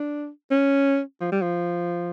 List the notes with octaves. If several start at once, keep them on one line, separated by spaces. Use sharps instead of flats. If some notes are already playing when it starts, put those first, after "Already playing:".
Already playing: D4
C#4
F3
G3
F3